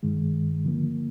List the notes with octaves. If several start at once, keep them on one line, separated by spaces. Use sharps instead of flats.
G2 D#3 G#3
D3 F3 A#3